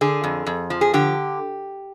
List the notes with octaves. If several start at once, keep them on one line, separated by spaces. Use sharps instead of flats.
D3 G#4
F2
F2
F3
G#4
D3 G4